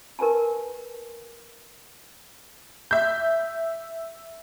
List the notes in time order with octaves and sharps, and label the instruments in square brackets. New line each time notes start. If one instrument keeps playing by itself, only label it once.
[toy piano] A#4 B4 G#5 A5
[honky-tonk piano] E5 G6